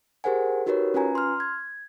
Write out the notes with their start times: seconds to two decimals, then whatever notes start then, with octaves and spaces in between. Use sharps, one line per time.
0.24 G4 G#4 A#4 C5 F#5 G#5
0.66 D#4 F#4 G4 A#4 B4 C#5
0.94 C#4 F4 B4 G#5 A#5
1.15 C6 F6
1.40 G#6